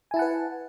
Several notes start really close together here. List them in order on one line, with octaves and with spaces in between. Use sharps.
G#5 E4 A5 F#5 B4